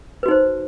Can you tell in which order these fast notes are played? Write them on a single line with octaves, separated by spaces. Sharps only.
B4 F#4 D#4 C5